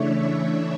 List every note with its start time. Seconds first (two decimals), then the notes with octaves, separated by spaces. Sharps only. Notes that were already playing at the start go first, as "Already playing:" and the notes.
Already playing: C#3 E3 A3 D4 C#5 E5